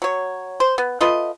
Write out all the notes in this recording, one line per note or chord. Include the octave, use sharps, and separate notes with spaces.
F#3 C#5
C5
B3
A3 F4 B4 D#5